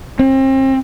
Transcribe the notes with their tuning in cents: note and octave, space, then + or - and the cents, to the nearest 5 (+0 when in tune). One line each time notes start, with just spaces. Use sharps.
C4 +35